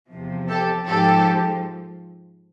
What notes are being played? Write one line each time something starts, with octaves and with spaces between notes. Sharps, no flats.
E2 C3 F3
G4 A4
G#2 F3 G4 A4